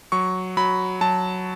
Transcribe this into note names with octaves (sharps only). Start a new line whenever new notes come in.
F#3 C#6
F#3 B5
F#3 A5